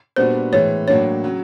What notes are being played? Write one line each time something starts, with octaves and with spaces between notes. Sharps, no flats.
A#2 G3 B3 D4 F#4 C5
A2 E3 G#3 C#5
A2 F#3 A#3 D4 C#5
C#3 F#3